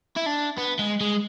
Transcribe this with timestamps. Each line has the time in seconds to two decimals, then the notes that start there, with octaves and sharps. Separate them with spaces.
0.16 E4
0.26 D4
0.58 B3
0.79 G#3
1.01 G#3